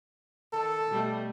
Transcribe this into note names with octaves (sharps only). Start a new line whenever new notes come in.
D#3 A4
B2 G3 A3